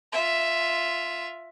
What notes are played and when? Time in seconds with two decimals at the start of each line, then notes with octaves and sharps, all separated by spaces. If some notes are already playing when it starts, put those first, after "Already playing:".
0.12 F4 E5